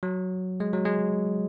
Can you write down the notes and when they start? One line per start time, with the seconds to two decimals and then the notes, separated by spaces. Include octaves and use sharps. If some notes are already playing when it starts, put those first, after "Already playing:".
0.03 F#3
0.60 G#3
0.73 F#3
0.86 G#3